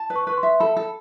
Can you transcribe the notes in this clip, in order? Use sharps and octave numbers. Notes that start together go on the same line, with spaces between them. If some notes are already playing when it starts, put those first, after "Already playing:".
Already playing: A5
B4
C#6
B4 C#6
C6
E5
A4 B5
A4